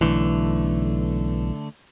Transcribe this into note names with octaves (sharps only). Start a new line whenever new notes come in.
B1 D3 E3 A3